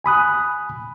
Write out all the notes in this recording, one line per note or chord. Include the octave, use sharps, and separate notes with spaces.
G#5 B5 D#6 F#6